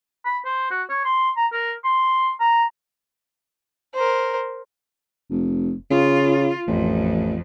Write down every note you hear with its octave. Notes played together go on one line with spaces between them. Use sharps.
B5
C5
F#4
C#5
C6
A#5
A#4
C6
A#5
A#4 C5
F1
C#3 F4
A1 F2